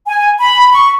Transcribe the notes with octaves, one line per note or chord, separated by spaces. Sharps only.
G#5
B5
C#6